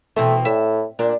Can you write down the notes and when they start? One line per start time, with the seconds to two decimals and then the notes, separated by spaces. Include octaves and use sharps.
0.16 B2 E3 A3 C4
0.45 A2 E5
0.99 A#2 D4